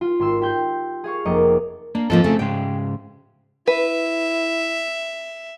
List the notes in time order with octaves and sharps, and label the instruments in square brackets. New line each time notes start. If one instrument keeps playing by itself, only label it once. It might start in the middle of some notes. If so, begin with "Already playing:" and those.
[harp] F4
G#1 C6 E6
G4 C6 G6
G#4 F5 C#6
F1 A#3 D#5 D6 C#7
[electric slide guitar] A#3 [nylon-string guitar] D4
[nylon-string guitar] G#2 F3 A#3 [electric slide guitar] C4 A4
[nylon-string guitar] C#3 A3
[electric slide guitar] G#2 C#3 G#3 [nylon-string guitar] G5
[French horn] E4 [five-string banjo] B4 [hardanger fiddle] E5